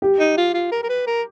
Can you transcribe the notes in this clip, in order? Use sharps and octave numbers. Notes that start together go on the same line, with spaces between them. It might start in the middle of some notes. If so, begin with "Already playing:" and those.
G4
D#4
F4
F4
A#4
A#4
B4
A#4